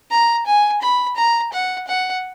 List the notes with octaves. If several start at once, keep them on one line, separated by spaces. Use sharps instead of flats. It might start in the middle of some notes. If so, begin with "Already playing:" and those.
A#5
G#5
B5
A#5
F#5
F#5